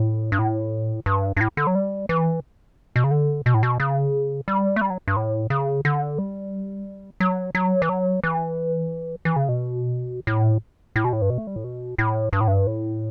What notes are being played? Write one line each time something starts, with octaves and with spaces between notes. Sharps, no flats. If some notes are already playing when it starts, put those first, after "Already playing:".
Already playing: A2
G2
A2
G2
G2
A2
D3
F#3
G3
E3
B2
C#3
D3
B2
A2
B2
C#3
G3
A3
G3
F#3
G2
A2
C#3
D3
G3
F#3
F#3
E3
F#3
E3
E3
C#3
B2
A2
A2
B2
A2
G2
B2
A3
G3
A2
B2
A2
G2
A2
G2
A2